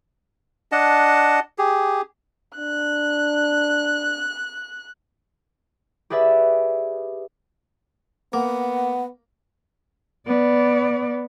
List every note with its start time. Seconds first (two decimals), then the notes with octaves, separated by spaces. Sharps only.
0.72 D4 D#5 F#5 A5
1.58 G4 G#4
2.57 D4 F#6
6.10 G4 G#4 B4 D5 E5
8.33 A#3 B3 F#5
10.27 B3 D5